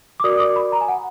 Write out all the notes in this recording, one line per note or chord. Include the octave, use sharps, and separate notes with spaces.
D6
F#4 A#4 D5 D#6
D6
B5
A#5
G#5
F#5